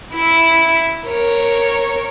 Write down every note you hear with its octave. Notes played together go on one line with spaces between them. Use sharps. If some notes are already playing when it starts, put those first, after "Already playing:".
E4 E5
A#4 C#5